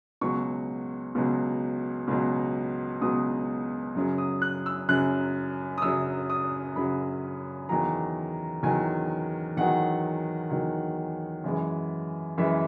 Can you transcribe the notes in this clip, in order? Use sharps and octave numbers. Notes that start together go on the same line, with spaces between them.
C#2 B2 F#3 C#6
C#2 B2 F#3
C#2 B2 F#3
C#2 B2 F#3 D#6
F#2 C#3 F#3
D#6
F#6
E6
F#2 C#3 F#3 F#6
D#6
F#2 C#3 F#3 E6
D#6
F#2 C#3 F#3 B5
E2 D#3 F#3 A#5
E2 D#3 F#3 G#5
E2 D#3 F#3 F#5
E2 D#3 F#3
F#2 E3 G#3
F#2 E3 G#3 E5